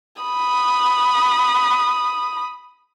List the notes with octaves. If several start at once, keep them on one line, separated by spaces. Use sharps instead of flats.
B5 D#6